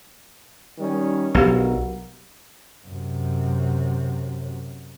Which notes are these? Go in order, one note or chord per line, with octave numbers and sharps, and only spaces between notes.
D#3 G3 C#4
B1 F#3 D4 F#4 G4 A#4 F5
F#2 C3